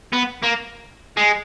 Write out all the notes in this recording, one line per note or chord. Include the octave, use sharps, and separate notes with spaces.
B3
A#3
G#3